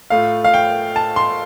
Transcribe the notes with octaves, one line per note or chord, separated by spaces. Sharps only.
A2 A3 F4 F5
F5
G5
A5
C6